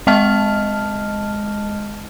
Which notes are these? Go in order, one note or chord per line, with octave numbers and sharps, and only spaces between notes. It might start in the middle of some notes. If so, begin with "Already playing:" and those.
G#3 D#5 A5 F6